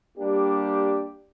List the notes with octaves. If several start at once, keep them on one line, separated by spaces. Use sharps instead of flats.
G3 A#3 D4 G4